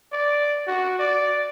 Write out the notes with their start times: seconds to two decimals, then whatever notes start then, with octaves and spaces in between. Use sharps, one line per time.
0.12 D5
0.67 F#4
0.99 D5